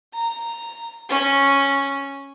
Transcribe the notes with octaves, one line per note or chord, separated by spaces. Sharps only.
A#5
C#4